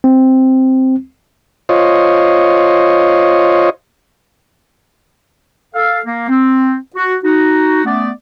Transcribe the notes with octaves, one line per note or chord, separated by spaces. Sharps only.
C4
F4 C5 C#5 D#5
A4 F5
A#3
C4
F#4
D#4 F#4
A3 B3 C#4 D5